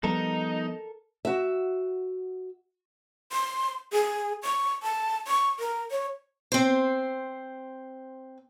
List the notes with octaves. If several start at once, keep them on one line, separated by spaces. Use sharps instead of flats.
F3 G3 B3 D#4 A4 A#4
F#4 E5
C6
G#4
C#6
A5
C#6
A#4
C#5
C4 C5